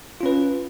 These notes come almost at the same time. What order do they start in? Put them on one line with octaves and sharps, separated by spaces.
F4 C#4 B4